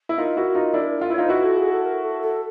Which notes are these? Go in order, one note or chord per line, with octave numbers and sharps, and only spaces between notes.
E4
D#4 F4 A#4
E4 F#4
D#4 F4
D4 E4
F4
E4 C#5
D#4 F4 C5
E4 F#4 B4
A4
G#4
A4
A#4
A4
A4